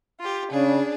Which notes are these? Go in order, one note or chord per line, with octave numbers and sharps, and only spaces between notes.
F4 G4
C#3 D4 G#4